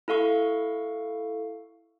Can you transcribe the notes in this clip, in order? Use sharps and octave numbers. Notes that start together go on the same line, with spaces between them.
E4 A4 F5 C#6